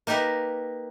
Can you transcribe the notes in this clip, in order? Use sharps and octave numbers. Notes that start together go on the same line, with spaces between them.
A#3 D#4 G4 A#4 B4